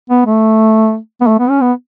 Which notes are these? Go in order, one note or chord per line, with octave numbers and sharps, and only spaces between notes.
B3
A3
B3
A3
B3
C#4
B3